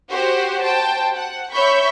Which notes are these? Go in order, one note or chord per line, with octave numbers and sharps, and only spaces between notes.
F#4 G4 C5 F#5
C5 G5 A5
F#5
C#5 E5 B5 C#6 G6 B6